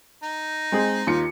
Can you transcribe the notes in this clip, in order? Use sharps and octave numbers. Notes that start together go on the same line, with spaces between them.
D#4
G#3 C4 G#4
D#2 F4 C#7